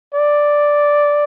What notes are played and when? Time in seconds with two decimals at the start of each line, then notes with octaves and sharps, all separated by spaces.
0.14 D5